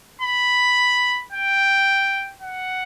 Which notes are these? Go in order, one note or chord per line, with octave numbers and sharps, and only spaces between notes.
B5
G5
F#5